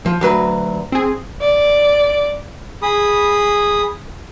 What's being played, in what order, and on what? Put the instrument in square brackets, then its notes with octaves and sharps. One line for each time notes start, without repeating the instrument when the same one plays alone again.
[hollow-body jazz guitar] F3
D2 F#3 B4
[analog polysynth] C4 G#4
[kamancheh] D5
[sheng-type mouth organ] G#4 B5 D#6